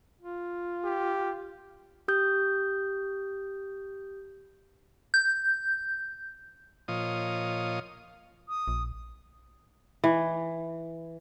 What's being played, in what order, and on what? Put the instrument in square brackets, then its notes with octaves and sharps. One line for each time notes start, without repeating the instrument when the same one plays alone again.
[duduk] F4
[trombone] G4
[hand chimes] G4 D#6 G6
[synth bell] G6
[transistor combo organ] A#2 F3 F4 C#5 D#5 D#6
[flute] D#6
[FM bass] A#1
[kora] E3